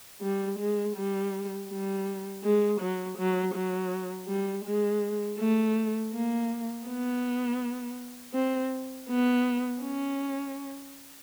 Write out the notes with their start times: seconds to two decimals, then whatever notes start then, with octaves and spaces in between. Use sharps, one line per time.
0.22 G3
0.59 G#3
0.96 G3
1.70 G3
2.44 G#3
2.81 F#3
3.18 F#3
3.55 F#3
4.29 G3
4.66 G#3
5.39 A3
6.14 A#3
6.87 B3
8.34 C4
9.09 B3
9.83 C#4